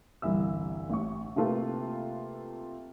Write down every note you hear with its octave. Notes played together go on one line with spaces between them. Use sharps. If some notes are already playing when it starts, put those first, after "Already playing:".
G1 C2 E3 E5 E6
A1 C#6
C3 A3 A#3 F4 A4 B4